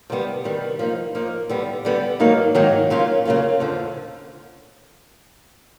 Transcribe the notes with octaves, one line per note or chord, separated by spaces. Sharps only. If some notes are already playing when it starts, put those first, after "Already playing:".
C3 D#3 G3 B3
C3 D#3 G3 B3
F3 A#3 D#4
F3 A#3 D#4
D3 G3 B3
D3 G3 B3
G#2 D#3 F#3 A#3 D#4
G#2 D#3 F#3 A#3 D#4
C#3 F#3 A#3 C#4 F4
C#3 F#3 A#3 C#4 F4
F2 D3 F3